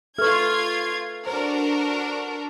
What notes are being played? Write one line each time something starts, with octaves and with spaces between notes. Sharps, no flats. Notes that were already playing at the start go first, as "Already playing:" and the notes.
F4 A4 B4 E5 C#6 F6 G#6
D4 F#4 A#4 C5